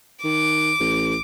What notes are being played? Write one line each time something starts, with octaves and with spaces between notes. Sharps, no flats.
D#3 D6
A1